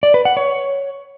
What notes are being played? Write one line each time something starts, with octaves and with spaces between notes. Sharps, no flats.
D5
B4
F#5
C#5